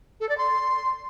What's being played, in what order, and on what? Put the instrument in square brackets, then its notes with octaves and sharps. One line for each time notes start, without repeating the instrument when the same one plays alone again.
[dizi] A4
D5
C6